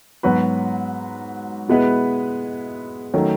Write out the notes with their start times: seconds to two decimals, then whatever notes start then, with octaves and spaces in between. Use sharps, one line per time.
0.23 G#2 F#3 B3 F#4 B4
1.68 B2 G#3 B3 E4 B4
3.13 D#3 F#3 A3 C#4